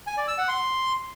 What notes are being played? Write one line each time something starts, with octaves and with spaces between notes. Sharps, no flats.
G#5
D5
E6
F#5
C6